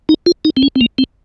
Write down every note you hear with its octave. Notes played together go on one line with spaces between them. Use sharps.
D#4
F4
D#4
C4
C#4
C4
A#3
C4